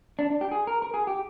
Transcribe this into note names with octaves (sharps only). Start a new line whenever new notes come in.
D4
D4
G4
G#4
A#4
A#4
G#4
G4